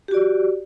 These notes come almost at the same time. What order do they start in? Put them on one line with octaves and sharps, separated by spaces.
G4 F#4 D5